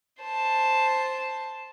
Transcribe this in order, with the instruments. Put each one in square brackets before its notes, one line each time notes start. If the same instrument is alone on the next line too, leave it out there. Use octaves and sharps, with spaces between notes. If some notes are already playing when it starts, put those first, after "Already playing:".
[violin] C5 A5